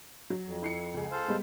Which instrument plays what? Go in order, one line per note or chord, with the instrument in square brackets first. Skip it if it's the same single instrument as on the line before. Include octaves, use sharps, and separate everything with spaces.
[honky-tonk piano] F#3
[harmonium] F2
[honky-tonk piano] E4 C7 C#7
C#2 G#4
[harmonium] A4 C5 F5
[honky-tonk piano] G3 G#3 B3